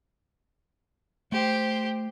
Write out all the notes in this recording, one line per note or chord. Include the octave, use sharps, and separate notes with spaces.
A3 G4 C5